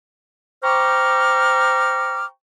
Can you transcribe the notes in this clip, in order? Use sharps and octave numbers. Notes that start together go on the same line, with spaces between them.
C5 G5 A#5 C#6 D6 F6